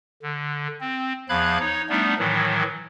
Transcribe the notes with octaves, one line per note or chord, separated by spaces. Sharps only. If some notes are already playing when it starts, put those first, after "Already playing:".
D3
C4
E2 F3 F5 B5 F#6 G#6
D#4 C#5
G3 A3 B3 D4 D#4
A2 D#3 E3 F#3